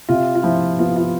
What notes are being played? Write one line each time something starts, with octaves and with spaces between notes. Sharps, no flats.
C3 F4
F4
F3 E4
B3 F4
F4